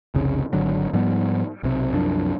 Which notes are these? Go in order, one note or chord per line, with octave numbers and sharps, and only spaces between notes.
F1 C2 C#3
G#1 D3 F#3
G#2 F3 G3 B3
B1 C3
C2 F#2 F3 D4